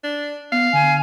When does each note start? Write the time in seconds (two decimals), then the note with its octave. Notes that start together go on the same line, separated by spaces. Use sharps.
0.04 D4
0.52 B3 F5
0.73 D3 G#5